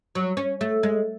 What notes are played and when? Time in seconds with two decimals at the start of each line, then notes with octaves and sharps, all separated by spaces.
0.15 F#3
0.37 C#4
0.61 A3
0.83 G#3